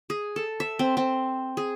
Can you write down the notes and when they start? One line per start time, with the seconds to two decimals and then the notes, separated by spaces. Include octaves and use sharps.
0.10 G#4
0.36 A4
0.60 E5
0.79 C4
0.97 C4
1.57 G#4